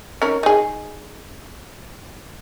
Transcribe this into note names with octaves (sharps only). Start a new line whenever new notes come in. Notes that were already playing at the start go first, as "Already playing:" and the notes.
C#4 D#4 A#4
D#4 G#4